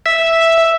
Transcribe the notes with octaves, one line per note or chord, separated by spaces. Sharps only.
E5